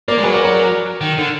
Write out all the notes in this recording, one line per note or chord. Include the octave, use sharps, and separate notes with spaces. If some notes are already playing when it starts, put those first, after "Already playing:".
A#3 A#4 D5
G#3
F#3 G#4 B4
A#4 D5
A#4 D5
A#4
D#3
D3